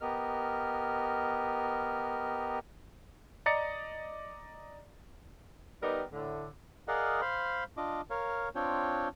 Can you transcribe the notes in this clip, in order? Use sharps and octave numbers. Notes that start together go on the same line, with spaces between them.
B3 G4 A#4 D#5 F6
D5 D#5 A#5 A6 C#7
G3 B3 D#4 G4 A#4
A2 D3
G#4 A#4 D5 D#5 F5 F#5
C5 F5 B5 C6
D4 F4 D#5 D6
A#4 C#5 F5
C4 D4 F4 C#5 G5